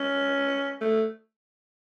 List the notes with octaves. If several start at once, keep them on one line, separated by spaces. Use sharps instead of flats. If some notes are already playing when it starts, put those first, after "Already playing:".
Already playing: C#4
A3